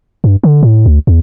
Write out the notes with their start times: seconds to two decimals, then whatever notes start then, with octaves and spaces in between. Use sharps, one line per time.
0.24 G2
0.44 D3
0.63 A2
0.86 D2
1.07 E2